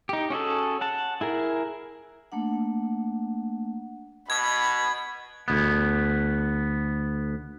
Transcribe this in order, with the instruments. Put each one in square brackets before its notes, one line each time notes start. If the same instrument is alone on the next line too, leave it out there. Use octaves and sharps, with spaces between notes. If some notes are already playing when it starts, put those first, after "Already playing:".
[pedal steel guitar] D#4 G4
C#4 F#4 G#4 A4
F#5 A5
E4 G#4 A#4
[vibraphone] A3 A#3 D4 F#5
[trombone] B2 [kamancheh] B5 [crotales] G#6
[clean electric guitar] D2 B3